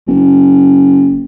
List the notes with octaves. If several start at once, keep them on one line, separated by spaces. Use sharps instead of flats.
F#1